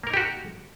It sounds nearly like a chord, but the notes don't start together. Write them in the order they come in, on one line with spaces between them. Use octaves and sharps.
A#3 A#4 D#4 G4 F#4